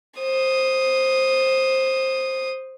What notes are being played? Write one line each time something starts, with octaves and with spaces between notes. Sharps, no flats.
C5 D#6